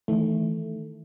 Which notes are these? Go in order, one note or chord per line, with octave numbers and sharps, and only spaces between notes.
D#3 E3 A3